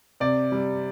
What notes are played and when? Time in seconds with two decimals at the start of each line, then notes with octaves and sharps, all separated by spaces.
0.20 C3 D5
0.52 G3